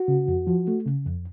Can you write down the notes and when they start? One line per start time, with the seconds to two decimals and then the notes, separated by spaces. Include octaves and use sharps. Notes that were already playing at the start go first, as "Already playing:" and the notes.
Already playing: F#4
0.08 C#3
0.28 F2
0.47 F3
0.68 A3
0.86 C#3
1.05 F2